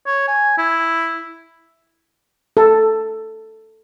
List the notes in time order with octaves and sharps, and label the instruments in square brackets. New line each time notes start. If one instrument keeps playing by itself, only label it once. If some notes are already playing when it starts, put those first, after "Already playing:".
[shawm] C#5
G#5
E4
[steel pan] A4